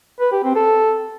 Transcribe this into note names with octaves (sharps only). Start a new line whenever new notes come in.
B4
G4
C4
A4